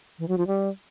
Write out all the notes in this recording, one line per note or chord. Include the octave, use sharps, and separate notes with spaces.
E3
F#3
F3
G3